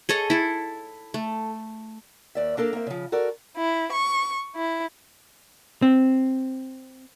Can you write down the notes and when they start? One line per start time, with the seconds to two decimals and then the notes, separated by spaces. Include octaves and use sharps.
0.09 G#4 A4 C#5 D#5
0.30 E4 A4
1.14 A3
2.35 D#2 D5 E5
2.57 A#3 D4 A4 A#4
2.73 A#3 C4 E5
2.87 C#3 F3
3.12 F#4 A4 A#4 D5
3.57 E4
3.93 C#6
4.55 E4
5.82 C4